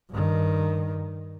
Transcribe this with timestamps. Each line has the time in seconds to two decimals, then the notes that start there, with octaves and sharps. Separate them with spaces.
0.10 G2 D#3